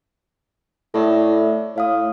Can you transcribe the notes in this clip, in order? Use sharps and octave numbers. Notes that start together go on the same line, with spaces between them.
A2 A4 D5 E5
A2 C#5 F5 D#6